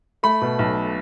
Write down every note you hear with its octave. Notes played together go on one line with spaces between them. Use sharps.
A3 B5
B2
B1